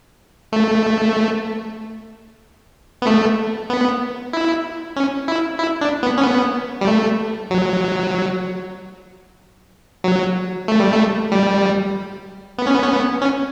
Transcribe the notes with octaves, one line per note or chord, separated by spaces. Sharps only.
A3
B3
A3
B3
E4
C#4
E4
E4
D4
B3
C#4
B3
G3
A3
F#3
F#3
A3
G3
A3
G3
B3
C#4
B3
C#4
B3
C#4